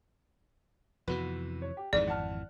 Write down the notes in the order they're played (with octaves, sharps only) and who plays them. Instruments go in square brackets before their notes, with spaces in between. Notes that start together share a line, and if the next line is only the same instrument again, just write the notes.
[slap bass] F2 C3 E3 [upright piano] B3 F#4 B4
[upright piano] C#5
G4
[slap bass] G#1 F2 E3 [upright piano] G#2 [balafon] D5
[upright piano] F#5 A5 F6